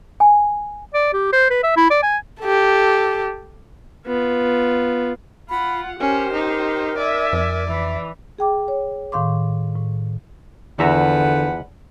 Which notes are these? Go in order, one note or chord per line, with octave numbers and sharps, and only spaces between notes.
G#5
D5
G4
C5
B4
E5
E4
D5
G#5
G4 A4
B3 F4
F4 F#5 B5
C#4 G4 A#4 C5
D#4
D5 E5 G#5
F2
E3 E5
G#4 G5 D6
C#5
A2 D#3 F5 C6 D6
A2
E2 D3 F3 B4 E5 F#5 A#5